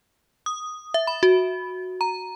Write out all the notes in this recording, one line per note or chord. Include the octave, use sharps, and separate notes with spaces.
D#6
E5
B5
F#4
A#5